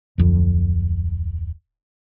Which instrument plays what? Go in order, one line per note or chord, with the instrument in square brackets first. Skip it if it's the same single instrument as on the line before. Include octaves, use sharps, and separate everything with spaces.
[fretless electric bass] D1 F2